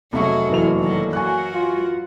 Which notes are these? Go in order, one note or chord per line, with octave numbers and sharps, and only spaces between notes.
F1 F#3 G#4 E5 C#6
F#2 D3 E3 A#3 F7
D#3 F#3
F#3 F#4 A#4 G#5 C#6 F#6
F4